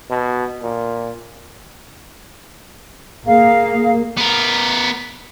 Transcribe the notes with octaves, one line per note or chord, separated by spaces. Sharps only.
B2
A#2
A#3 G#4 F5
B3 A#4